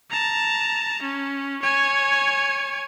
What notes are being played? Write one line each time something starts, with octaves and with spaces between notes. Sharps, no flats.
A5 A#5
C#4
C#5 G#5